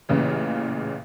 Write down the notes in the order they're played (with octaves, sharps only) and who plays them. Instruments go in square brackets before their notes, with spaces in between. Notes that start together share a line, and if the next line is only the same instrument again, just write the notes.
[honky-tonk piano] A1 A#2 C#3 E3